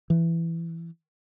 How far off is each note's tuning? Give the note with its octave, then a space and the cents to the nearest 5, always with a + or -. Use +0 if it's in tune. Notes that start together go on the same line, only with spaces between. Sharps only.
E3 +15